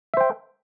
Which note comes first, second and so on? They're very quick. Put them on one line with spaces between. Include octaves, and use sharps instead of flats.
E5 C5 G5